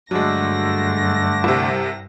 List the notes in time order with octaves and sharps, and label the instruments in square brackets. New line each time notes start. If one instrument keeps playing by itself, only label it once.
[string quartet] G2 A#6 [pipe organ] D3 A3 D4 [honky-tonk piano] F#3 G#3
[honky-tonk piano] C2 C3